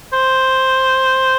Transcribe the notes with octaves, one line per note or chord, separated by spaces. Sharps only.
C5